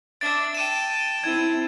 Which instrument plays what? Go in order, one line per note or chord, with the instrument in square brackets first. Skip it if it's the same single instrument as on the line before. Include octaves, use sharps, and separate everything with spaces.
[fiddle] D4 E5 [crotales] A6 D7
[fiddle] G5 A5 [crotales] D#7 E7
[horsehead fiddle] C4 E4 [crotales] G#6